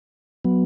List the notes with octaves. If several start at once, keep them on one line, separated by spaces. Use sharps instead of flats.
F#3 B3